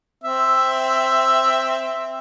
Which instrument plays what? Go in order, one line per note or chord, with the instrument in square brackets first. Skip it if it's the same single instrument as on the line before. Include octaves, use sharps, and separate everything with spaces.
[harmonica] C4 E5